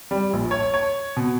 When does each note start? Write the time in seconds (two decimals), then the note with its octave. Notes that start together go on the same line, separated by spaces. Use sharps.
0.11 G3
0.33 A#1
0.51 C#5
0.74 C#5
1.17 B2